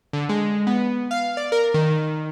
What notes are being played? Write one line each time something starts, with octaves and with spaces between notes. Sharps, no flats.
D3
G#3
B3
F5
D5
A#4
D#3